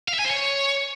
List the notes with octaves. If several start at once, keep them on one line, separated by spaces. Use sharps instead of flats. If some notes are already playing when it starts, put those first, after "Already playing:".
F5
E5
G#5
C5
C#5